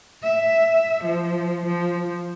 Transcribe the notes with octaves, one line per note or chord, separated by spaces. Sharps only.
E5
F3
F3